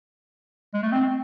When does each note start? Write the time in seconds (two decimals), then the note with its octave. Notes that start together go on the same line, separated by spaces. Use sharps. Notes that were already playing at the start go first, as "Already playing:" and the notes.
0.74 G#3
0.83 A3
0.92 C4